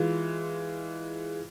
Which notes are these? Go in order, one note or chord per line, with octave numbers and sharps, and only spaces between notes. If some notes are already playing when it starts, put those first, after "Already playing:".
Already playing: E3 G#3 F4